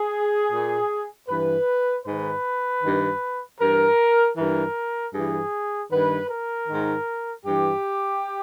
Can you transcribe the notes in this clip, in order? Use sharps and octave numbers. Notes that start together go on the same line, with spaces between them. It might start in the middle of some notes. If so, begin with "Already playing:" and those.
Already playing: G#4
A#2
G2 E3 B4
G#2 D#3 B4
G2 D#3
G2 E3 A#4
G2 E3 A#4
G2 E3 G#4
G2 D#3 B4
A#4
G#2 D#3
G2 E3 G4